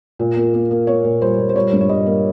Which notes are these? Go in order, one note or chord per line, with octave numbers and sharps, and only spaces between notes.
A#2
A#3
A#3
A#3
A#3 C#5
A#2
G3 C5
A#2
C5
G3 C#5
G2
C#5
G3 D#5
A#3